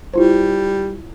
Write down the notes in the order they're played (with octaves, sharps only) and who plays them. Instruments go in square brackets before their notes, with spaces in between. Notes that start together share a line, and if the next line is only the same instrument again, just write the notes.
[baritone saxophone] G3 [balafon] E4 F4 C5